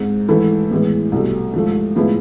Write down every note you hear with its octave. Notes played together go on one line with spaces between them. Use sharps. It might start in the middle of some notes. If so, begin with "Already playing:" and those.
Already playing: G#2 G#3 C4
G#2 E3 A3 E4 A4
A2 E3 G#3 B3
C2 B2 A3
G#2 F3 A3
A2 F3 G#3 B3 E4